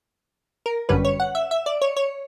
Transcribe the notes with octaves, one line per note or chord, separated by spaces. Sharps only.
A#4
G1 F#2 D3 G3 C#4 B4
C#5
F#5
E5
E5
D5
C#5
C#5